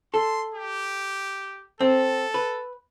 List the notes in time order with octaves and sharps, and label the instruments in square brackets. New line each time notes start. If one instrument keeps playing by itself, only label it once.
[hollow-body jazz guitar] A4 [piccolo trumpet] C6
[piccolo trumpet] G4
[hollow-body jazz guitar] C4 [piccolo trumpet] A4
[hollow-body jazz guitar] B4